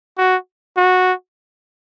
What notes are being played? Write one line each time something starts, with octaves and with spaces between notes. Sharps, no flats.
F#4
F#4